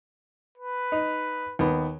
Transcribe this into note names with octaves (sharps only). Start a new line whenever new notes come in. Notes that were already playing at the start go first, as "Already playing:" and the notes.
B4
D#4
D#2 B3